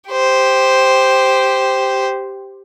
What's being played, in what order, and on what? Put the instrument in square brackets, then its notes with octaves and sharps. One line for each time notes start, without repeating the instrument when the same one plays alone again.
[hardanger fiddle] G4 C5